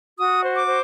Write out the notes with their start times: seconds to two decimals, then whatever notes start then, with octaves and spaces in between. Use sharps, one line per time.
0.18 F#4 D#6
0.43 C5
0.55 D6
0.67 C5